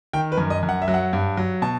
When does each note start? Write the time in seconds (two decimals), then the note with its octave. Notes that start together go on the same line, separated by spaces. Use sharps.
0.13 D#3 G5
0.32 B4
0.38 F#2
0.50 D#5
0.63 F#2
0.69 F#5
0.82 E5
0.88 F#3
0.94 F#5
1.13 G2
1.37 F#3
1.62 B2 A5